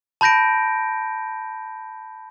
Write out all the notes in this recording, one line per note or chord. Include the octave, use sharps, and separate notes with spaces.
A5 B5 G6 A#6 D7